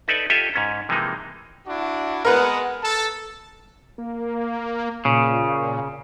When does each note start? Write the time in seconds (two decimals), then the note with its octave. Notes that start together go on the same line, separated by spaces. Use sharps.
0.08 D#4 A4 B4 D5 E5
0.30 F4 G4 A4 C#5 D#5 E5
0.54 G#2 C#4 A#5
0.89 C3 E3 F3 G#3 A#3 D#4
1.66 D4 E4 F#4
2.25 G#3 B3 A#4 B4 F#5
2.83 A4 A5
3.98 A#3
5.05 A#2 C#3